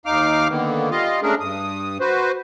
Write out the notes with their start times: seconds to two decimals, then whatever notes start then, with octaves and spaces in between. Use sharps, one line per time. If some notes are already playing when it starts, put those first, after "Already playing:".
0.06 D#2 D#4 F5 D6 F6
0.49 D3 D#3 A#3 B3
0.91 G3 F4 D#5 F5
1.23 G#3 A3 C#4 D4 G#4 A#4
1.40 G2 D#6
2.00 F#4 B4 C5